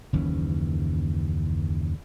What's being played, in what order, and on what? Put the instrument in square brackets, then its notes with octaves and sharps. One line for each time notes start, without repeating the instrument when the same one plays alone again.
[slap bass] F#1 D#2 E3 C#4